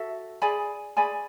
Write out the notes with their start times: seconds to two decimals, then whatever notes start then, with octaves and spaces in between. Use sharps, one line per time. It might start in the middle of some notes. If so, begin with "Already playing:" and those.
Already playing: F#4 A4 E5
0.42 G#4 D5 G#5 B5
0.97 G#4 D5 G#5 B5